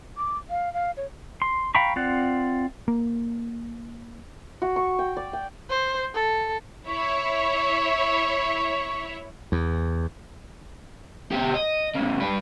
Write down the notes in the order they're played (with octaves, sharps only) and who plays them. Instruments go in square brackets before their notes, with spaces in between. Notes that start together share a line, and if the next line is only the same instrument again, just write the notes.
[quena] D6
F5
F5
C#5
[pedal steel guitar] C6
F5 G5 A#5 B5 C#6
C4 F4 D5 F#5
[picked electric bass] A#3
[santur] F#4
C#6
G5
D5
G5
[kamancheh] C5
A4
[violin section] E4 C#5 E5 [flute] C#6
[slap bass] E2
[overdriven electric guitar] B2 G4
D#5
A2 C#3
G2 B4